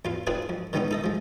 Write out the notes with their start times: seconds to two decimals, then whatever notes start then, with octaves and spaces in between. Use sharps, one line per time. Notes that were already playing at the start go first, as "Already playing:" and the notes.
0.05 E2 F4 F5
0.27 C4 D4 D#4 F4 G#4 B4
0.49 F2
0.73 D3 D#3 G#3 B3 C#4 D#4
0.91 D#4 A4 D#5
1.04 F3 G#3